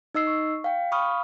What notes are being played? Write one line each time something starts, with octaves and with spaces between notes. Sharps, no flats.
D#4 D#5 E6 C7
C#6
F5 G5
F5 B5 C#6 D#6 F6